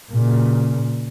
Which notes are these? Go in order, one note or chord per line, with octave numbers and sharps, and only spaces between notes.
A#2 C#3